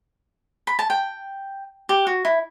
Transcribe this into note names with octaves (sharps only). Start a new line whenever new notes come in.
B5
A5
G5
G4
F#4
E4